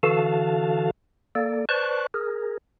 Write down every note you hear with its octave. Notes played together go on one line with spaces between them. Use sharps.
D3 E3 F#4 A4 F5 A5
A#3 A4 D5
B4 C5 D5 A5 C#6 F#6
G#4 A#4